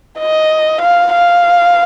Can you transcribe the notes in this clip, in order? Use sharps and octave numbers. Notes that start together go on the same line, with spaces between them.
D#5
F5
F5